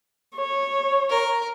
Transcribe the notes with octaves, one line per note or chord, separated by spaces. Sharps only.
C#5
A#4